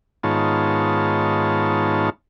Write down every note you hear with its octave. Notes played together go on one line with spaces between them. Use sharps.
G#2 D#3 B3 F4 C#5 A5